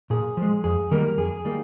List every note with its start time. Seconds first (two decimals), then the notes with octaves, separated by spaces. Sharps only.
0.10 A#2 G#4
0.37 F3 G#3
0.64 F2 G#4
0.91 D#3 G3 A#3 A#4
1.18 F2 G#4
1.45 D#3 G3 A#3